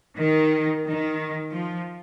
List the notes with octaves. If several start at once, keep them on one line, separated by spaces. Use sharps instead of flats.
D#3
D#3
F3